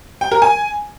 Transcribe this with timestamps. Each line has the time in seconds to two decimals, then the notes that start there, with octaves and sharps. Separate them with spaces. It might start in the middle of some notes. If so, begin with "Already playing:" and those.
0.21 G5
0.32 A#4
0.42 G#5